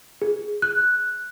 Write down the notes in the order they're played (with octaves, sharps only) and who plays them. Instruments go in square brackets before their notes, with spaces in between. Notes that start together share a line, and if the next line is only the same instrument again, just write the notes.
[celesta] G#4
F#6